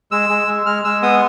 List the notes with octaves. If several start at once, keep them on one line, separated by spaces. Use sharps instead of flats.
G#3 E6
G#3
G#3
G#3 F6
G#3 E6
B3 D#6